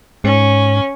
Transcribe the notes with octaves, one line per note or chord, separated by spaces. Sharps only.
G#2 C#4